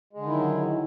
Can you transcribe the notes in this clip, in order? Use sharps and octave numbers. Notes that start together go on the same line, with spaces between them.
D3 D#3 F#3 G#3 E4